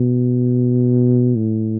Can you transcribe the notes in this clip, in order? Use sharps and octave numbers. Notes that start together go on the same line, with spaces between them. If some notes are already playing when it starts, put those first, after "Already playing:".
Already playing: B2
A2